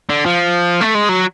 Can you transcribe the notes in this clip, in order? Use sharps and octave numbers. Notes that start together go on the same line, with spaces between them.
D3
F3
A3
G#3
F#3